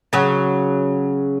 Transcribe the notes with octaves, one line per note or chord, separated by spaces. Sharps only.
C#3 F#3